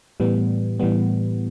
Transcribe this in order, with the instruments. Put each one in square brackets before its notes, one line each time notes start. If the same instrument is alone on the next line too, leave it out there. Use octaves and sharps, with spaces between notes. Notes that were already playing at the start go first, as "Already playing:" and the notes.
[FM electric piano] A2 E3 G3 B3
A2 E3 G3 B3